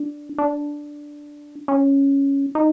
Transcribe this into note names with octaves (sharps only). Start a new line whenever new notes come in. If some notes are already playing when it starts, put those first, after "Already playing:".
Already playing: D4
D4
C#4
D#4